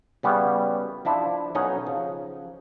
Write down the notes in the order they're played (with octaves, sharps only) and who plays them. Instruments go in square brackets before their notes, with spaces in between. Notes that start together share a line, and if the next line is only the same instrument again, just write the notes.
[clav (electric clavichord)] C#3 G3 B3 C#4 E4
F3 D4 E4 C5
B1 C#4 D#4 C#5 D#5 F#5
C#3 F3